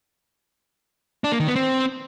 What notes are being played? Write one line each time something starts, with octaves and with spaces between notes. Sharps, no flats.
D4
A#3
D#3
B3
C4